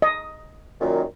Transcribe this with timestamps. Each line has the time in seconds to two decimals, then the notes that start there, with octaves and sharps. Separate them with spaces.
0.02 D#5
0.81 F#2 A#2 D#3